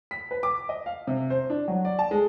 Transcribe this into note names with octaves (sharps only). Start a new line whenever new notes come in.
B6
B4
D6
D#5
F5
C3
C5
D4
F#3
D5
A5
G#3